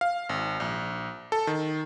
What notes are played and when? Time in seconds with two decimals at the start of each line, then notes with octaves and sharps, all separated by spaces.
0.01 F5
0.29 G#1
0.60 A#1
1.32 A4
1.47 D#3